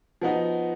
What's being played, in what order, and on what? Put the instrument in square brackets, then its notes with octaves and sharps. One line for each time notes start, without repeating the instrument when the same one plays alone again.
[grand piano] F3 B3 D#4 F#4